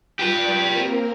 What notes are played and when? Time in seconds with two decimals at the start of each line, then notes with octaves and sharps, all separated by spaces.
0.19 F4 G4 B4 D5
0.69 A#3 C4 A#4